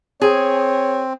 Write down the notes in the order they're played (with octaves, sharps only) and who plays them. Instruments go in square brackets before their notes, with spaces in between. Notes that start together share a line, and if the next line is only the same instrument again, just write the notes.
[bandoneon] C4 [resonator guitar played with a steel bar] G#4 [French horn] C#5